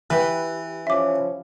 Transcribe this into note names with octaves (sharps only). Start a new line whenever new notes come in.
E3 G4 B4
F3 C#4 E5 D6